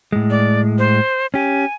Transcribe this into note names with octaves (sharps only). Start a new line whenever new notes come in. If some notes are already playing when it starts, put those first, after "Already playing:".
A2 G#3
D5
C5
C#4 G4 G#5